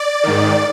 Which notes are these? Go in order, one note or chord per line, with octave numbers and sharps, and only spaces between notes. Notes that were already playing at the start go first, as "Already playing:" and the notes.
Already playing: D5
G#2 D#3